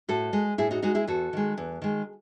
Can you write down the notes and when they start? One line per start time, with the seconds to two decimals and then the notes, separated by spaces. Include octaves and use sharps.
0.09 A2 F#4 A4
0.33 G#3
0.58 A2 E4 G#4
0.71 D#4 F#4
0.82 G#3 D#4 F#4
0.95 E4 G#4
1.07 E2 F#4 A4
1.33 D#3 G#3
1.58 E2
1.82 D#3 G#3